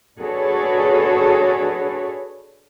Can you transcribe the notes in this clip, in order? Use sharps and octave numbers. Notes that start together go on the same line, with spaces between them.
D4 F#4 G#4 A4 B4 C#5